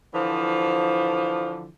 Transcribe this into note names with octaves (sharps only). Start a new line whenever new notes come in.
D3 E3 F3